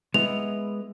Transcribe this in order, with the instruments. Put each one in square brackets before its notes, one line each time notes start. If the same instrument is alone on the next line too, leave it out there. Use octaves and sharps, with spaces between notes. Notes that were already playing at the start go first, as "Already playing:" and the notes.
[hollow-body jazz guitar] G#3 B3 E4 [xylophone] F7